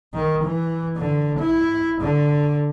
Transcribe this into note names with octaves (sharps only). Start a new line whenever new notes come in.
D#3
E3
D3
E4
D3